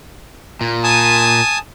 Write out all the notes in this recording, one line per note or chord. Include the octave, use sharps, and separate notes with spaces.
A#2
G#5 A5 D#6